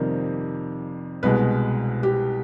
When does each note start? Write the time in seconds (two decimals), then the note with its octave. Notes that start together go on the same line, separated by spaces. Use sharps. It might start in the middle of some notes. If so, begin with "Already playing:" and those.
Already playing: F2 C3 D#3 G3 A#3
1.23 C2 B2 G#3 B4
2.03 G4